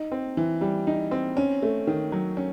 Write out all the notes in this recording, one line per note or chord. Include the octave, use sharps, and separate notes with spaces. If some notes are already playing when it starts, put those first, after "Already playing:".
Already playing: D#4
C4
E3
G3
D#4
C4
C#4
A3
D#3
F#3
C#4